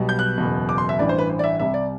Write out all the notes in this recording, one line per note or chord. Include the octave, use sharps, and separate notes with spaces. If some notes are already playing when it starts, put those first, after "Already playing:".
Already playing: B1 B2 G3 B3
G6
F#6
F#1 E2 B2
D6
C6
E5
A1 G2 E3 D5
C5
B4
C5
D5
E5
C2 C3 G3 E5
D5